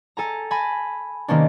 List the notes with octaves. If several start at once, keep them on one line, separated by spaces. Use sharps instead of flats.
A4 G#5 A#5
G#5 A5 B5 A#6
C3 D#3 A#3 C#4 D4